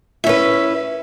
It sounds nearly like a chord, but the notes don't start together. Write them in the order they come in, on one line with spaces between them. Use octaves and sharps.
E4 C#4 B4